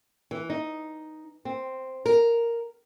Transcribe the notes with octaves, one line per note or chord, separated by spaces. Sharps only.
E3
D#4
C4
A#4